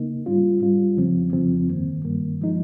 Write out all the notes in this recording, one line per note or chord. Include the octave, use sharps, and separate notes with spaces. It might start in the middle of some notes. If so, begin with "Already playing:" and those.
Already playing: C#3 A#3 D#4
G#2 G3 C#4 F4
G#2 G3 C#4 F4
F2 C#3 F3 C4
F2 C#3 F3 C4
G2 D#3 A#3
G2 D#3 A#3
F3 G#3 D#4